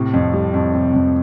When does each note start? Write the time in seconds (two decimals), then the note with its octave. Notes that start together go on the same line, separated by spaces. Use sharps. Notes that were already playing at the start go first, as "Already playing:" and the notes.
Already playing: A2 C3
0.14 F2
0.34 G3
0.54 F2
0.74 C3
0.94 F2